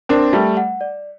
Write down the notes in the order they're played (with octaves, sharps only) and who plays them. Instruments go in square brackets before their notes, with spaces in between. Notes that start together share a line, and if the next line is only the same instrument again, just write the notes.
[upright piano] C4 D4 [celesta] A#4
[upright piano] G3 A3 [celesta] D5
[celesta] F#5
D5